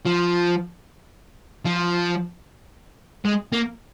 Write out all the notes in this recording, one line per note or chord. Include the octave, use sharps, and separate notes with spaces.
F3
F3
G#3
A#3